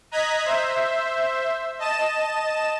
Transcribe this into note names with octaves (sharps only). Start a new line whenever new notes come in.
D#5 A#5 F#6 G#6 B6
C5 E5
D#5 A5 E7